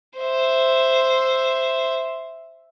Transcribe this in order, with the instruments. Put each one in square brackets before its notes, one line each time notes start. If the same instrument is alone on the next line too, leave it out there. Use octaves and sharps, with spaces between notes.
[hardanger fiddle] C5 E5